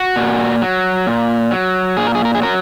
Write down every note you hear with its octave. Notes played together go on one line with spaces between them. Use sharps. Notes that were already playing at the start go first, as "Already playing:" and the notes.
Already playing: F#4
A#2
F#3
A#2
F#3
A#2 G#4
A#4
G#4
A#4
G#4
F#3 A#4